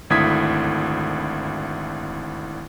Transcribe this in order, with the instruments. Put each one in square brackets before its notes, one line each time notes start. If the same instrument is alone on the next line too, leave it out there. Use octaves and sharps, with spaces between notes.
[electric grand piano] G#1 D2 E4 D#6 G#6 B6